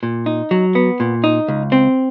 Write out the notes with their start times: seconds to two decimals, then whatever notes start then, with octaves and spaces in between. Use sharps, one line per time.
0.03 A#2
0.26 D#4
0.51 F#3
0.75 B3
1.00 A#2
1.24 D#4
1.48 C#2
1.72 C4